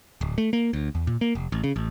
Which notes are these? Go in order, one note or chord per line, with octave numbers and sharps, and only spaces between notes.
D1
A3
A#3
D2
E2
A#2
A#3
F1
A1
C#3
A1